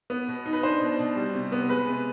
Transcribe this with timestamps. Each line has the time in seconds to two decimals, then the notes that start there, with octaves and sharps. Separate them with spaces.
0.10 B3
0.28 B2
0.46 D#4
0.53 B4
0.63 D4 C5
0.81 B2
0.99 B2
1.16 G3
1.34 C3
1.52 B3
1.69 G#3 B4
1.87 C3